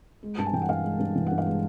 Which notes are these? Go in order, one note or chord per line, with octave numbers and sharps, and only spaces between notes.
G#3
G2 A5
G#5
E3 G5
F#5
G2 F5
G#3
G2
E3
G2 F#5
F5
G#3